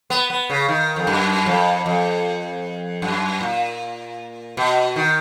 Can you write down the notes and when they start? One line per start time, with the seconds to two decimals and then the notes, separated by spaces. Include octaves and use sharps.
0.10 B3
0.30 B3
0.50 C#3
0.69 D#3
0.96 F2
1.07 F#2
1.46 F2
1.86 F2
3.02 F#2
3.41 A#2
4.57 B2
4.96 D#3